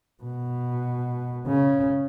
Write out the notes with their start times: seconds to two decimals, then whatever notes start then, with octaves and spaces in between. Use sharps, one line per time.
0.23 B2
1.47 C#3